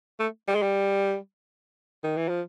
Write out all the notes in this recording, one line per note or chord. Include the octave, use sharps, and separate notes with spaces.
A3
G3
G#3
G3
D#3
E3
F3